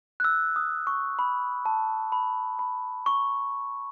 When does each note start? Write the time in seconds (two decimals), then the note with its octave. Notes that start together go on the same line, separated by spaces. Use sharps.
0.20 F#6
0.24 E6
0.56 D#6
0.87 C#6
1.19 B5
1.66 A5
2.12 B5
2.59 B5
3.06 C#6